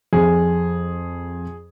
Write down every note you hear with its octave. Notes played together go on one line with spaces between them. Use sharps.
F2 G#4